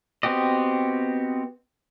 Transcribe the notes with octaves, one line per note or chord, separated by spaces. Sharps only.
B3 C4 F#4 G4 D#5